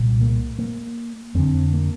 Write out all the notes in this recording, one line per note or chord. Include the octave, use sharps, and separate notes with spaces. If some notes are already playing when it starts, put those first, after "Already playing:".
Already playing: C2 A#2
A#3
A#3
F2 D3 C4
A#3